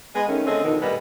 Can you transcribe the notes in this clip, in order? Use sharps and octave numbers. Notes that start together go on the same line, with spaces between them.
G#3 B3 D#5
D#3 A3 C#4
D3 A3 C4 C#4 G#4 D#5
F2 B2 D3 D#3
D2 A#2 G3 B3 D4 D#5